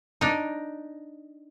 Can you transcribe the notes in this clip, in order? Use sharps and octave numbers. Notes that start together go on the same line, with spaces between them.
D4 D#4